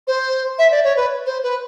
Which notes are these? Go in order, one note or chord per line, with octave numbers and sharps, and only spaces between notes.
C5
E5
D5
C#5
B4
C5
B4